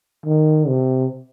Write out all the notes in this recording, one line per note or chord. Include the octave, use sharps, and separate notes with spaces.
D#3
C3